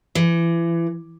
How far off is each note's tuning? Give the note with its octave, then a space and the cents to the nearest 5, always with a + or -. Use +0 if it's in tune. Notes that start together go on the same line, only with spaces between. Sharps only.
E3 +30